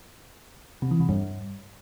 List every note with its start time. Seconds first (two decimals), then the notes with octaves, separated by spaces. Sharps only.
0.82 C3
0.91 E3
1.00 C3
1.09 G2